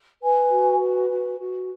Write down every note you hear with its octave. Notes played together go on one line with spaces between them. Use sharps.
B4 G#5
F#4
B4
F#4
F#4